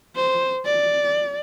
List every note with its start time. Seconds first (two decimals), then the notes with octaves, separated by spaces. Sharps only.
0.16 C5
0.65 D5